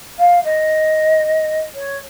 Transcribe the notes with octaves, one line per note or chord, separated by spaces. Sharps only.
F5
D#5
C#5